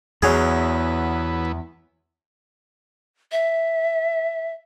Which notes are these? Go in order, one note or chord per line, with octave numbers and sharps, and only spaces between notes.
E2 E3 F#3 B3 G#4
E5